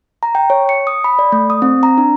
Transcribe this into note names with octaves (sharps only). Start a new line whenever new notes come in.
A#5
G5
C#5
C#7
D#6
B5
D5
A3
D#6
C4
A#5
D4